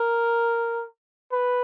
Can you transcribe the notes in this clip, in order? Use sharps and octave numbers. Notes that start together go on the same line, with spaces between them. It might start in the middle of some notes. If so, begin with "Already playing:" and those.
Already playing: A#4
B4